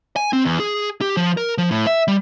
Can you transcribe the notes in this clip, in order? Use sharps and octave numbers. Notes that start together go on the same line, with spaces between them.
G#5
C4
E2
G#4
G4
F3
A#4
F3
A2
E5
G3